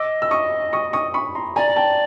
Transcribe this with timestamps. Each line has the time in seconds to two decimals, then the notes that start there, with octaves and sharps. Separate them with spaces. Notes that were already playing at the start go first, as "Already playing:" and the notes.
Already playing: D#5 D6 E6
0.22 E6
0.31 C#6 D#6
0.73 C#6 D#6
0.93 C#6 D#6
1.14 B5 C#6
1.35 A#5 C6
1.56 D5 G#5 A#5
1.68 A#5
1.76 G5 A5